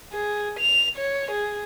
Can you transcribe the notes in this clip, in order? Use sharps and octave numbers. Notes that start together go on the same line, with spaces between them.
G#4
F7
C#5
G#4